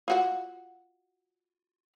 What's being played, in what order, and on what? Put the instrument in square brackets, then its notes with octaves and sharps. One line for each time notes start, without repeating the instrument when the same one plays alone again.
[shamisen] F4 F#4 F#5